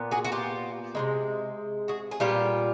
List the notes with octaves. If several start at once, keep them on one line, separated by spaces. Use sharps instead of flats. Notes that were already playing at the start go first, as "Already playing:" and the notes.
Already playing: A#2 B3
F#4 G#4
F#4
F4 G4
C3 D#3 G#3
F#4 G#4
G#4
A#2 G3 B3 F4 G4